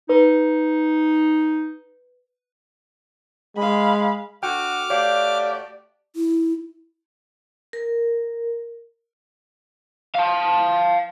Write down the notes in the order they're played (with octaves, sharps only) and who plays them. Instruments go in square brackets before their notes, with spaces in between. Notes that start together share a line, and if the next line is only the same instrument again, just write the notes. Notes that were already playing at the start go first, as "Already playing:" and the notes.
[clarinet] D#4 [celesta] B4
[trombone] G#3 [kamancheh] F5 B5
[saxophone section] D3 F#4 [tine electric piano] G5 [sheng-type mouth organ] D6 F6
[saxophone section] A3 F#4 G4 [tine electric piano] C#5 F5 [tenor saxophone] D5
[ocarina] E4
[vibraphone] A#4
[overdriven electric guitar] F5 A5